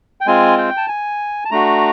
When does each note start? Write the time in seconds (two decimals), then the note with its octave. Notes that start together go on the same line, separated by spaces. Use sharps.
0.21 G5
0.26 G#3 C4 F4 G#5
0.58 G5
0.77 A5
0.88 G#5
1.45 A5
1.51 A3 D4 F#4 A#5